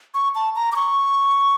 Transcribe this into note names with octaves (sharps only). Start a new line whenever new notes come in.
C#6
A5
A#5
D6
C#6